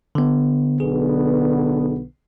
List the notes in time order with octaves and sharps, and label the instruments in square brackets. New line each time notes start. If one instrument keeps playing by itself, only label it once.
[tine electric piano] D3 B3
[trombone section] B1 D3 B3 [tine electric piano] G#4